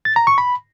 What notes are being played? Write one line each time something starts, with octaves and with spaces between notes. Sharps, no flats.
A6
A#5
C#6
B5